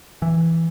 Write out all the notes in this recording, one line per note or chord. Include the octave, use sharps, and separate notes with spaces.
E3